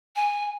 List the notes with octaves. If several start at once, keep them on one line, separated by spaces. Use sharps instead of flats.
G#5